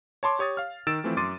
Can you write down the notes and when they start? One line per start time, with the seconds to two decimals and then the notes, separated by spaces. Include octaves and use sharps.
0.23 C#5 A5 C6 D6
0.39 G4 C#5 D#6 A6
0.57 F5 F6
0.87 D#3 E6 A6 D7 E7
1.04 E3 F3 A3 C4 E4
1.17 F#2 C6 D6 A6 D#7